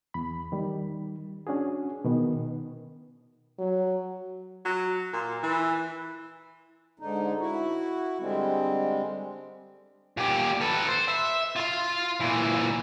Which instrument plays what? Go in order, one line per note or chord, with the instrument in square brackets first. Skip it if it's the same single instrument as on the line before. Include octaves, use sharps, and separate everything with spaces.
[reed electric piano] E2 B5
D#3 G3
C#4 D4 F#4 G#4
B2 D#3 B3
[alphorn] F#3
[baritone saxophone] F#3
A#2
E3
[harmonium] G#2 D3 D#4
E4 F#4
D3 G3 G#3 C4
[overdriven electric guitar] A#2 G4
A4 B4
C5
E5
F4 C6
A#2 E3